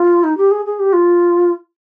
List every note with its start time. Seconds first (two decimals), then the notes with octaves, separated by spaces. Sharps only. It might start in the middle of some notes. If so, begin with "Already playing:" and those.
Already playing: F4
0.23 D#4
0.37 G4
0.51 G#4
0.65 G#4
0.79 G4
0.93 F4